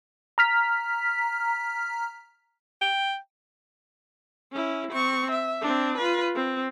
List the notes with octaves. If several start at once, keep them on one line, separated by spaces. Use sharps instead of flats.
A#5 F6 B6
G5
C#4 E4
C4 C#6
E5
C4 D4
F4 B4
C4